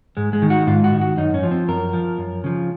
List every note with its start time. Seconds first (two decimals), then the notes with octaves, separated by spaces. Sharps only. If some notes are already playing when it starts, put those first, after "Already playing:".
0.17 G#2 G#3
0.33 G#3
0.42 D#3
0.50 F#4
0.67 G#2 F4
0.84 F#4
0.92 D#3
1.01 F#4
1.17 F#2 D#4
1.34 C#4
1.43 F3
1.51 C4
1.68 F#2 A#4
1.93 F3
2.18 F#2
2.44 C#3 F3